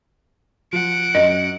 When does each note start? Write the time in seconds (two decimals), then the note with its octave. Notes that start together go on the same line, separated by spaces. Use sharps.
0.73 F3 F#5 D7
1.15 F#2 D#5